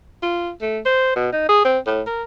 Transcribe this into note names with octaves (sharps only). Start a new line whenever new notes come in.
F4
A3
C5
B2
D#4
G#4
C4
A2
A#4